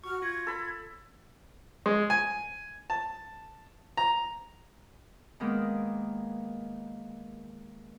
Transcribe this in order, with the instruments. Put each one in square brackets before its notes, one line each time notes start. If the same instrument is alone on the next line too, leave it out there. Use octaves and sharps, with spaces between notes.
[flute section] F#4 F6 [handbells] C#6
[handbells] F4 A#6 C#7 [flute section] G#6
[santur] A4 B5
[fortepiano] G#3
G#5
A5
A#5
[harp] D#3 G#3 A#3 B3